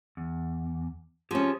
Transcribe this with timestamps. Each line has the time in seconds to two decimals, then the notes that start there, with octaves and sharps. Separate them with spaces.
0.17 E2
1.31 F3 C#4 G4 G#4